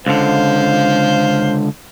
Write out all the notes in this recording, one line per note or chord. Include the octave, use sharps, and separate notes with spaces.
C#2 D3 C5 F5